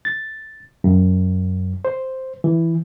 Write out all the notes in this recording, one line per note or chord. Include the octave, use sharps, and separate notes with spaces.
A6
F#2
C5
E3